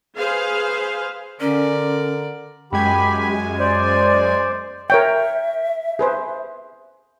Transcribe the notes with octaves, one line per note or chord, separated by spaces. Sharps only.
G#4 B4 C5 F5
D3 C#4 A#4 D5
F#2 G#3 G4 G#5 B5
C5 D5
A#4 C#5 E5 G5
G#4 B4 C5